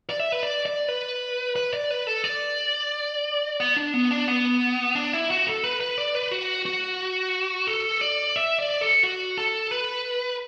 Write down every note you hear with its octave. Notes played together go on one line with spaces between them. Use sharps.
D5
E5
B4
D5
D5
B4
B4
D5
B4
A4
D5
B3
D4
B3
D4
B3
D4
E4
F#4
A4
B4
B4
D5
B4
F#4
F#4
A4
D5
E5
D5
A4
F#4
A4
B4